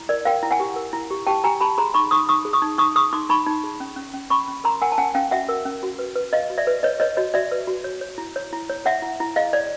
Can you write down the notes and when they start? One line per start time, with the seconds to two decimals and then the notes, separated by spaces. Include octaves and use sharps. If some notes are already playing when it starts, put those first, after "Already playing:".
Already playing: E4
0.09 A#4 D5
0.25 A#4 F5 G5
0.43 E4
0.51 F#5 G#5
0.60 G4
0.76 A#4
0.93 E4
1.11 G4
1.27 G4 G5 A5
1.44 G4 G#5 A#5
1.60 G4 A5 B5
1.78 G#4 A#5 C6
1.94 D#4 B5 C#6
2.11 D#4 C#6 D#6
2.29 D#4 C#6 D#6
2.45 G#4
2.53 C#6 D#6
2.62 D#4
2.78 D#4 C#6 D#6
2.96 G#4 C#6 D#6
3.13 D#4 C6 D6
3.29 D#4 B5 C#6
3.47 D#4
3.64 G#4
3.80 C#4
3.96 C#4
4.14 C#4
4.30 C#4 B5 C#6
4.48 C#4
4.64 A#4 A#5 C6
4.81 A#4 F#5 G#5
4.92 A5
4.98 C#4 F#5 G#5
5.14 C#4 F5 G5
5.31 F#4 E5 F#5
5.49 A#4
5.66 C#4
5.83 F#4
5.99 B4
6.16 B4
6.33 B4 D#5 F5
6.50 F#4
6.58 D5 E5
6.67 B4
6.83 B4 C#5 D#5
7.00 B4 C#5 D#5
7.17 F#4 C#5 D#5
7.34 F#4 D5 E5
7.52 B4
7.67 F#4
7.84 C#5
8.01 C#5
8.18 E4
8.36 C#5
8.53 E4
8.70 C#5
8.85 C#5 E5 F#5
9.02 E4
9.20 E4
9.36 G#4 D#5 F5
9.53 C#5 D5